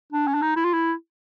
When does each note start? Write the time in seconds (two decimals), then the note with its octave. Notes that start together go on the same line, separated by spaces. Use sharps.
0.12 D4
0.27 C#4
0.34 D4
0.42 D#4
0.56 E4
0.65 F4
0.73 E4